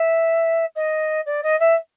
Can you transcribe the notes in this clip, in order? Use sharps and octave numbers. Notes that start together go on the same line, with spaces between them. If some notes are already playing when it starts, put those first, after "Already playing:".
Already playing: E5
D#5
D5
D#5
E5